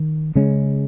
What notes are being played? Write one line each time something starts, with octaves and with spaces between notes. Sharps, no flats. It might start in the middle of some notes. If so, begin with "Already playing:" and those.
Already playing: D#3
C#3 G#3 C#4